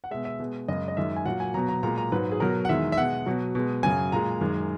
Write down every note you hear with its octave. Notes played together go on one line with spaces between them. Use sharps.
F#5
B2 G#3 E5
E5
B2 G#3
F#2 C#3 G#3 D#5
D#5
F#2 D#3 G#3 E5
G#5
A#2 F#3 F#5
G#5
B2 F#3 A#5
A#5
A#2 G#3 A#5
A#5
G#2 F#3 B4
G#4
B2 F#3 A#4
F#5
E2 D#3 G#3 E5
E5
B2 G#3 F#5
B2 F#3
B2 G#3
F#2 C#3 F#3 G#5
A#2 G#3 A#5
F#2 D#3 G#3